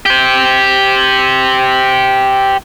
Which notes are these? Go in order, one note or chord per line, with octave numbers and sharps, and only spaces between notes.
G4 C5